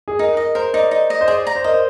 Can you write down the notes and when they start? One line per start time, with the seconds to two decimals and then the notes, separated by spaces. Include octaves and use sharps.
0.08 G#4
0.19 D#4 A#4
0.37 A#4 D#5
0.55 A#4 C5
0.73 D#4 D5
0.91 D#4
1.10 D#5
1.21 C5
1.28 G#4 D5
1.47 A#5
1.56 C5
1.64 A#4 D#5
1.74 C5